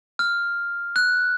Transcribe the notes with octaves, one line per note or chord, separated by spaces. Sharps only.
F6
F#6